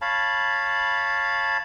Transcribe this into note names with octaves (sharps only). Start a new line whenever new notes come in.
C#5 F5 A5 B5